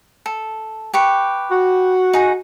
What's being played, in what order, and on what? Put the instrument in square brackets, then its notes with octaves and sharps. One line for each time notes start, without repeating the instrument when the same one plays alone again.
[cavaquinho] A4
G4 B4 C#6
[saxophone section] F#4
[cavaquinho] D#4 G#4 A#5